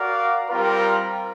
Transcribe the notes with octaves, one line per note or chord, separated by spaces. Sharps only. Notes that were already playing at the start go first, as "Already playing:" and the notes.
Already playing: F#4 A#4 D5 F5
G3 C4 F4 A#4